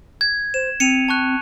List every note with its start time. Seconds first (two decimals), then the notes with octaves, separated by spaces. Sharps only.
0.21 G#6
0.54 C5 E7
0.80 C4 C#7 D#7 F7
1.09 A5 C#6 F#6